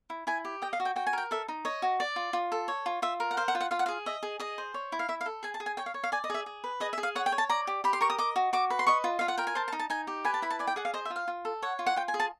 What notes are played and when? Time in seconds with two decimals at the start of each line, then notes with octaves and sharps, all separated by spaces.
0.10 E4
0.27 E4 G#5
0.45 G4
0.62 D#5 G5
0.73 F5
0.80 F#4
0.85 G5
0.96 F#4 G5
1.07 G#5
1.13 A#4 G5
1.31 A4 E5
1.48 D#4
1.65 C#5 D#5
1.82 F#4
2.00 D5
2.16 F4
2.33 F4
2.52 A4
2.68 C#5
2.86 F4
3.02 F4 E5
3.20 A#4
3.31 F#5
3.37 C5 F5
3.48 F#5
3.55 F4
3.60 F#5
3.71 F4 F5
3.79 F#5
3.86 F5
3.88 G#4
4.06 D#5 E5
4.23 G#4
4.40 G#4 D#5
4.58 C5
4.74 C#5
4.92 E4
4.99 F5
5.08 E4 E5
5.21 F5
5.26 A4
5.43 G#4 G#5
5.54 A5
5.60 G#4
5.66 G#5
5.77 C#5 G5
5.86 F5
5.94 C#5
6.04 F5
6.12 D5 G#5
6.24 D#5
6.30 G#4 E5
6.46 G#4
6.64 B4
6.80 G#4 D#5
6.93 E5
6.98 G#4
7.03 F5
7.15 C#5 F#5
7.26 G5
7.32 C#5
7.38 A5
7.49 D5 A#5
7.67 G4
7.84 G4 B5
7.93 C6
8.01 A#4 C#6
8.10 D#6
8.18 D#5 D6
8.36 F#4
8.53 F#4 D6
8.70 B4
8.79 C6
8.87 D#5 C#6
9.04 F4
9.19 F4 F5
9.28 F#5
9.38 A#4 G5
9.47 G#5
9.55 C5 A5
9.68 A5
9.72 D#4
9.79 A5
9.90 D#4 G#5
10.07 G4
10.24 B4 G#5
10.34 A5
10.42 E4 B5
10.50 A5
10.59 D5 G#5
10.67 G5
10.76 G#4 F#5
10.85 F5
10.94 C5 D#5
11.05 E5
11.10 F4
11.16 F5
11.28 F4
11.45 A4
11.62 C#5 F#5
11.79 F4
11.86 F#5
11.96 F4 G5
12.08 G#5
12.14 G#4
12.20 A5